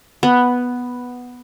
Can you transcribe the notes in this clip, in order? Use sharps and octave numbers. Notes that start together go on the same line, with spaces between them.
B3